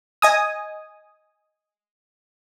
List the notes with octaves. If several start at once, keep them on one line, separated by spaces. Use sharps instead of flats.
D#5 G#5 D#6